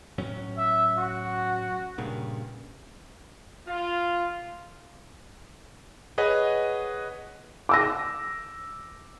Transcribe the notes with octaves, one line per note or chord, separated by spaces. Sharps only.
A2 F#3 C#4
E5
F#4
G2 A#2 C#3
F4
G#4 B4 C#5 D#5 F#5
D6 E6 A#6